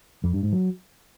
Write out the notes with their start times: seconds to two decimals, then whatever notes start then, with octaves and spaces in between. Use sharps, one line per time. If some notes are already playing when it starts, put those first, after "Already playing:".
0.24 F2
0.33 G2
0.43 G#2
0.53 F#3